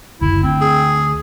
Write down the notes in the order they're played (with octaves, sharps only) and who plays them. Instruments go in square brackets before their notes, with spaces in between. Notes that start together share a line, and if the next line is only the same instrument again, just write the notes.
[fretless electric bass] F#1 D2 [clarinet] E4
[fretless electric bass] D2 D4 [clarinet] C4
[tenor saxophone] G#4